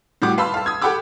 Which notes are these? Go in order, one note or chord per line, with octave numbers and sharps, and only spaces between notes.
A2 G3 F#4 D6
B4 F5 A5 B5 C6 E6
F5 A5
D#6 E6 G#6
G4 A4 F#5 B5 D6 E6